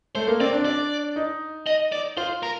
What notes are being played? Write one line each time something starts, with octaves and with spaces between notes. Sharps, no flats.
A3 C5
A#3
C4 D5
D4
D5
D#4
D#5
D5
F4 C5
A#4